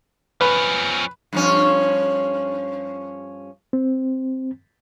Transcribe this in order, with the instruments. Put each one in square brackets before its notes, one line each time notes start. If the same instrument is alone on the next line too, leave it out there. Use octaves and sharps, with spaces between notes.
[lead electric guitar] F3 C#4 [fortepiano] B4
[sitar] G2 F3 C#4
[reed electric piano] C4